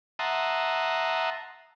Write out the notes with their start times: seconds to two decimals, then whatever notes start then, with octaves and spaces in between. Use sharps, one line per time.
0.19 E5 F#5 A5 A#5 C6 D#6